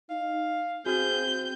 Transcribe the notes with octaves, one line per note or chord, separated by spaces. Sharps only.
D#4 F5
C4 F#4 G#4 G6